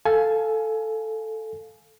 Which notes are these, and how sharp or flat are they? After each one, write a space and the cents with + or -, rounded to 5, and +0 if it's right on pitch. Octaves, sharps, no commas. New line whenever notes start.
A4 +0 F5 +0 G#5 +25